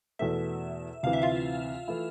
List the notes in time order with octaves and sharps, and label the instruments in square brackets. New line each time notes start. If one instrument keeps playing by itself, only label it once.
[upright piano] E2 B2 A3 [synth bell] E5
[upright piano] D2 C3 E3 [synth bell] F5
[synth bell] E5
F4 F5
[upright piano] E3 A3 E4